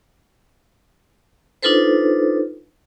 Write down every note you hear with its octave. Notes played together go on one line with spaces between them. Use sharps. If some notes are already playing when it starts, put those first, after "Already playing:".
D4 D#4 F4 A4 B4 C5